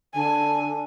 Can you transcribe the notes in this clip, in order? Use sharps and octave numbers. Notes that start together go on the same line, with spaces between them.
D3 G#5